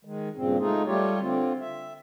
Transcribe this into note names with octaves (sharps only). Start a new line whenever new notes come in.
D#3 G#3
G2 A#2 C#3 C4
G#3 A3 D#4 F4 G#4
G3 A3 F4 G4 C#5
D3 C4 F4
E5